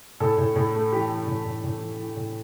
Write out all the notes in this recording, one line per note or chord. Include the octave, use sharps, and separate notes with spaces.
A2 A4
A2
A2
A3
E3 G4
E3
A2
A2
A2
E3
E3
A2